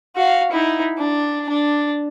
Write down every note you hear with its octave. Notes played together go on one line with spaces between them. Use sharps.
F#4 F5
D#4 E4
D4
D4